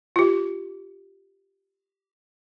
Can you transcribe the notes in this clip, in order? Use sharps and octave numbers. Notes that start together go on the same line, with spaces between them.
F4 G4